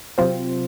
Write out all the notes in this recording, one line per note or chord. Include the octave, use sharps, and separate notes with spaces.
C3 F#3 C4 F4 C5